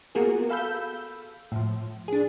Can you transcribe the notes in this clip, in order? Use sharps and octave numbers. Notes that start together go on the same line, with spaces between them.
A#3 B3 F4 F#4 G#4 A#4
A4 F5 B5 E6 G6
A2 F3
D4 G#4